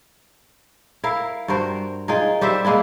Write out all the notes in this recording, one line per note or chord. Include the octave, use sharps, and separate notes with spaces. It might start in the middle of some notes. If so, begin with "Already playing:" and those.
E4 A#4 F5
G2 F#4 A#4 C5
D#4 F4 G#4 A#4
G3 G4 C5 E5
G#3 A#3 B3 E4